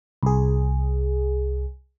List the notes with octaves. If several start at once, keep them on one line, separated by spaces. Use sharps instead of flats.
C2 G#4